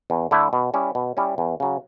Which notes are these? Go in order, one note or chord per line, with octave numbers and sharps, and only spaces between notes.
E2
D3 A3 E4
B2
G3 C#4 E4
B2
G3 C#4 E4
E2
C#3 F#3